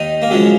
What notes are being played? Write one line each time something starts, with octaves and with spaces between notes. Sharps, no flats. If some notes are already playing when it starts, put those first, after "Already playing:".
Already playing: D#2 D#3 D#4
A#3
F#2 C#3 F3 G#3